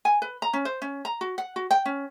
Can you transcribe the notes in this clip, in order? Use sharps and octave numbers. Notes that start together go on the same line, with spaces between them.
G#5
B4
A#5
C#4
C5
C#4
A#5
F#4
F#5
F#4
G5
C#4